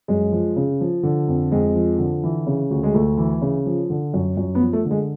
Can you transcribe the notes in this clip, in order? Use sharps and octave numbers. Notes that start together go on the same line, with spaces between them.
F#2 G#3
F3
C#3
F3
D3
F2
F2 G#3
F3
D3
E3
C#3
D2
G#3
D2 A3
E3
C#3
F3
D3
F#2
F#2
B3
F3
A3
D3
G#3